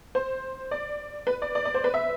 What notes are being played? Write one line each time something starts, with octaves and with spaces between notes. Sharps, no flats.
C5
D5
B4
D5
D5
D5
C5
B4
E5